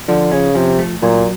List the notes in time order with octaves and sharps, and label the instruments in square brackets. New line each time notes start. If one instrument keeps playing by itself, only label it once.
[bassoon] D3 [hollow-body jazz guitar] F3
[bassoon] C#3 [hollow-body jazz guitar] C#4
[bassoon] C3 [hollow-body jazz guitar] F3
[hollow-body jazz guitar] A3
[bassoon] A#2 [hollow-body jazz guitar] F#3